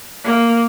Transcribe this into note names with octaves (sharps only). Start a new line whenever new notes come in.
A#3